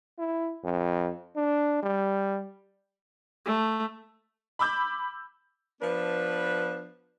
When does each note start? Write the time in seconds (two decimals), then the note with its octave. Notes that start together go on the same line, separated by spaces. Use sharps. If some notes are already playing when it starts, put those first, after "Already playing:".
0.19 E4
0.64 F2
1.36 D4
1.83 G3
3.46 A3
4.59 B5 D6 E6 G6
5.81 F3 B3 D4 B4